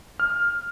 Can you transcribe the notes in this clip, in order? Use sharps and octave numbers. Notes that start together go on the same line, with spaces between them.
F6